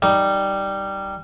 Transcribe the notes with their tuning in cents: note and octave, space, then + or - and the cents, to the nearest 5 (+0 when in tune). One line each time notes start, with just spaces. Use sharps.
G3 +0 D#4 +0